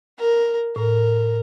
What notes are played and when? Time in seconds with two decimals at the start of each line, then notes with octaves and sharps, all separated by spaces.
0.18 A#4
0.76 A2 A#4